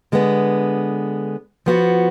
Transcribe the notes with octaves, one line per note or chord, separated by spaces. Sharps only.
D3 G#3 B3
F3 B3 F#4